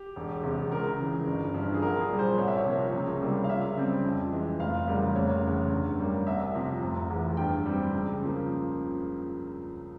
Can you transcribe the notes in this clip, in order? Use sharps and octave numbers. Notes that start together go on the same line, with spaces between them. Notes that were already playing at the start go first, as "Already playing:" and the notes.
Already playing: G4
E1
E2 C3
C#2 A#4
C#3 E3
G1
G2 F3
G#4
C2 A#4
G#4
A#2 G3
C5
C2 C#5
E5
C#5
C3 F3 A#3
C#2
C3 G3 A#3
F5
C#2 E5
C#3 G3 C4
F2
E3 G#3
F1 F5
E2 C#3 G3 A#3
F1 C#5
E2 C#3
G2
G3 A#3
C2 E5
C3 F3
F1
E2 E3
G2 G5
G3 C4
C#2
C#3 F3 A#3